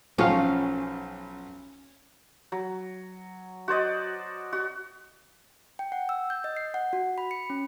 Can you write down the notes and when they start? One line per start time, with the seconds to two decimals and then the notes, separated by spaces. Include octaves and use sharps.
0.18 B1 F3 C#4 F5
2.52 F#3
3.68 F#4 C5 D5 D#5
4.53 F#4
5.79 G5
5.92 F#5
6.09 E6
6.30 G6
6.44 D#5
6.57 C7
6.74 F#5
6.93 F#4
7.18 B5
7.31 C#7
7.50 C#4